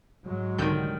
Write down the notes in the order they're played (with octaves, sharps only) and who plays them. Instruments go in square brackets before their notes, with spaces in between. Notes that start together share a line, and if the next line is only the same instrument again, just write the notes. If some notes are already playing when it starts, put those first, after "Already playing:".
[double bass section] G#2 F#3 G#3
[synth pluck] C2 D3 G6 [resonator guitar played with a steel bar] D#3 G3